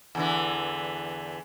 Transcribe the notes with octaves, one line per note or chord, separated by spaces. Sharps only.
E2 D3 E3